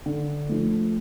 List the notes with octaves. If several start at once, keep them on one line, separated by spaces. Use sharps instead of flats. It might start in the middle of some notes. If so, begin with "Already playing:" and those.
D3
F3 A3